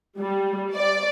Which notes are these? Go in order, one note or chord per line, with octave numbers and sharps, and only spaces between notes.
G3
D5